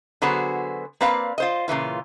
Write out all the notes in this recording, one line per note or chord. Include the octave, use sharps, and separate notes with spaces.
D3 F#3 B3 F#4 G#4 C5
A#3 C4 B4 D5 F5
F4 C5 D#5
A#2 C#3 E3 F4